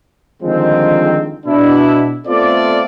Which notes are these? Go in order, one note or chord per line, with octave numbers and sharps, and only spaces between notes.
D3 D#3 F3 G3 G#3 C4
B2 D4 E4
A3 B3 C4 F4 A4 D5